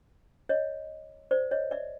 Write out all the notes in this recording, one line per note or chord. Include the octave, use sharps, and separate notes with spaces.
C#5 D#5
C5 D5
C#5 D#5
D5 E5